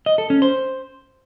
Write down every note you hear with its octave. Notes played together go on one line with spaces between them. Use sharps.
D#5
A4
C#4
C5